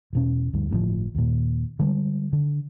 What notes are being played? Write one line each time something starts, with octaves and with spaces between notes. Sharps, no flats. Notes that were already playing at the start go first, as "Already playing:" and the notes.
E1 B2 C#4
D2 G2
G1 A2 C3 F3
D#2 A#2
D3 G3 G#3
D3